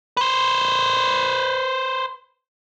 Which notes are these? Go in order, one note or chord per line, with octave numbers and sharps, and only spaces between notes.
B4 C5